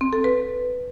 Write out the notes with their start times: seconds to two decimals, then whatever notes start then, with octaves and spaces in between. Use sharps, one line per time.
0.01 C4
0.13 A4
0.24 B4